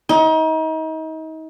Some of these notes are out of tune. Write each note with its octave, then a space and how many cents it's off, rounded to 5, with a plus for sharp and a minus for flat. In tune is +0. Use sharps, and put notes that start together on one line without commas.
D#4 +35